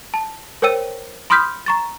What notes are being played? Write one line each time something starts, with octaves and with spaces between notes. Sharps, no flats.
A5
A#4 C5 C#5 G5 E6 D#7
B5 C6 D#6 F6 G6 B6
A#5 C#6 A6